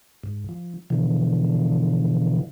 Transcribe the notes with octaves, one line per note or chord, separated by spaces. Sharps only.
G#2
F3
B2 D3 E3 F3